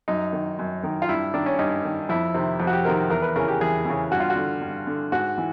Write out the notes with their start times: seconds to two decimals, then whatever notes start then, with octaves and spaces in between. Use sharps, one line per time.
0.08 F#2 D#4
0.33 D#3
0.59 F#2
0.83 D#3
1.02 F4
1.09 G2 E4
1.34 D#3 D4
1.46 C#4
1.59 G2 D#4
1.84 D#3
2.09 F2 E4
2.34 C3 D#3
2.60 F2
2.67 F#4
2.73 G4
2.85 C3 D#3 A#4
3.10 E2 A#4
3.22 B4
3.36 C#3 E3 A#4
3.48 G4
3.61 E2 G#4
3.85 C#3 E3
4.11 G2 F#4
4.20 F4
4.30 F#4
4.36 D3
4.61 G2
4.87 D3
5.12 G#2 F#4
5.38 E3